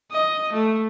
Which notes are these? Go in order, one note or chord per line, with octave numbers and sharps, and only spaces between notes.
D#5
A3